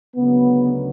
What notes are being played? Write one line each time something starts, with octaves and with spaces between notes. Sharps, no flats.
D2 C#3 F#3 B3